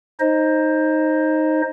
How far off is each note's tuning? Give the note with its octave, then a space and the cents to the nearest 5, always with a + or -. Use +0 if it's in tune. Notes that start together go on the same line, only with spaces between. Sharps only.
D#4 +0 C5 +15 D#5 +0